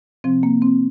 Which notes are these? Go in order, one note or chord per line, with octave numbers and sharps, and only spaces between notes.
C3 F3 C4
A#3
C4